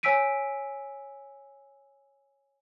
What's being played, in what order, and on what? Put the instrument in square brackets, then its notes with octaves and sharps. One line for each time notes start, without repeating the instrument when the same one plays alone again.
[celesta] C#5 G#5 E6 B6 D7 D#7